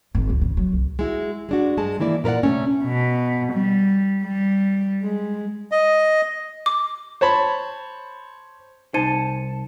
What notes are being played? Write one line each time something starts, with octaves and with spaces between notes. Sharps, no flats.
G#1
C#2
C#3
F#3
C2
G#3 E4 F#4
G#3 D4 F#4
G2 G#3 A5
D#3 E3 A#3 E4 D5
A#2 A#4 B4 D5 F#5
C3 A3 C#4
B2
G3
G3
G#3
D#5
D6
C5 C#5 A5 B5
C2 D#4 C5 A5 C#7 D#7